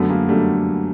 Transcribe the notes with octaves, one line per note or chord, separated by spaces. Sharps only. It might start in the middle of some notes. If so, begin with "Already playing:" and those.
Already playing: F#2 D3 F#3 A3 B3
G#3 A#3
D3 F#3 G3 A3